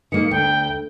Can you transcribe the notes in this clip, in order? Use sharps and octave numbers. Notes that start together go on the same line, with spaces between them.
D#3 A#3 C#7
D2 G5